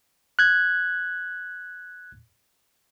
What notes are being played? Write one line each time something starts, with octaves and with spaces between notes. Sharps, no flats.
F#6 G#6